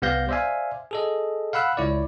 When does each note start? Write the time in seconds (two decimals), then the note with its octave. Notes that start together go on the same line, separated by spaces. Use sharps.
0.02 C2 B3 G4 F5 G6 A#6
0.29 C5 D5 E5 F5 G#5
0.91 G#4 A4 D#5
1.53 F5 F#5 B5 E6 F#6
1.77 C#2 E4 C#5 D5